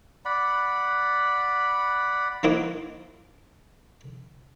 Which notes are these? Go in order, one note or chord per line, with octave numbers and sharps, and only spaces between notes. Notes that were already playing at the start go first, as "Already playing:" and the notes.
D5 F#5 B5
F3 A#3 D#4 E4 F#4 D6